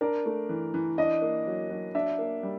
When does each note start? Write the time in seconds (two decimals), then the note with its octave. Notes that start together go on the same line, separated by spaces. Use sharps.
0.01 D4 A#4
0.26 A3
0.49 E3
0.74 E3
0.98 D4 D#5
1.22 A#3
1.47 F#3
1.70 F#3
1.95 D4 E5
2.18 A#3
2.43 G3